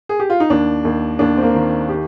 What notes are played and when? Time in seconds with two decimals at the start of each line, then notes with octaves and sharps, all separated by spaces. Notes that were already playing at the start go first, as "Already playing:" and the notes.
0.09 G#4
0.20 G4
0.30 F4
0.40 D#4
0.50 D#2 D4
0.85 D#2
1.19 D#2 D4
1.37 C4
1.42 A#3
1.54 D#3
1.89 G4